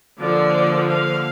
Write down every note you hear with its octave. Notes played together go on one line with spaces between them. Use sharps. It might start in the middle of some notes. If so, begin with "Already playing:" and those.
D3 F3 A#3 D5
F5